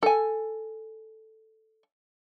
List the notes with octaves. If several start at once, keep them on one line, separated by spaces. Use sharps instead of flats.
A4 G#5